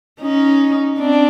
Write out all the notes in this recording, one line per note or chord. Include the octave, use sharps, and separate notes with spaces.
C#4 D#4
C4 D4